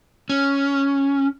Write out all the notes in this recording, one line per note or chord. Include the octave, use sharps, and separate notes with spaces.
C#4